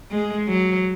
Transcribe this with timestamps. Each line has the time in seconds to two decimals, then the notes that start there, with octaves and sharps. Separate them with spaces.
0.11 G#3
0.47 F#3